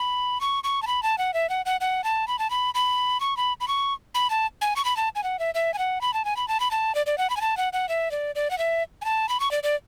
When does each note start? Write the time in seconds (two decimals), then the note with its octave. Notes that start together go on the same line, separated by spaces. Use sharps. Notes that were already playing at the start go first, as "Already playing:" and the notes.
Already playing: B5
0.41 C#6
0.64 C#6
0.82 A5
0.87 B5
1.03 A5
1.18 F#5
1.34 E5
1.50 F#5
1.66 F#5
1.81 F#5
2.04 A5
2.28 B5
2.39 A5
2.50 B5
2.75 B5
3.20 C#6
3.37 B5
3.60 B5
3.68 C#6
4.15 B5
4.30 A5
4.61 G#5
4.76 C#6
4.85 B5
4.97 A5
5.16 G#5
5.24 F#5
5.39 E5
5.55 E5
5.74 G#5
5.78 F#5
6.01 B5
6.14 A5
6.25 G#5
6.37 B5
6.48 A5
6.60 B5
6.71 A5
6.95 D5
7.06 D5
7.18 F#5
7.30 B5
7.37 G#5
7.41 A5
7.57 F#5
7.73 F#5
7.89 E5
8.11 D5
8.35 D5
8.51 F#5
8.58 E5
9.02 G#5
9.05 A5
9.29 B5
9.40 C#6
9.51 D5
9.63 D5